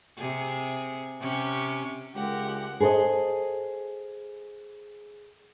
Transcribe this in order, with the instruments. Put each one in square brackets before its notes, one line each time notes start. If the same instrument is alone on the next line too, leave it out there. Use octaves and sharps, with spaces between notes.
[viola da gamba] C3 G#4
C3 C#4 G4
[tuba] C#2 [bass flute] G#3 [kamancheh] G4 [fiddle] A#4 F#5
[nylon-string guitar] G#4 A4 B4 C5 D#5